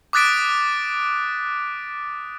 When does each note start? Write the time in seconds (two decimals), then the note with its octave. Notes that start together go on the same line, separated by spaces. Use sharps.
0.13 D6 D#6 F#6 A6 B6 D7